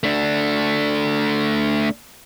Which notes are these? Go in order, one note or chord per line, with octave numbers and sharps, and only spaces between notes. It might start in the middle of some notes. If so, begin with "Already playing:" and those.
A3 D4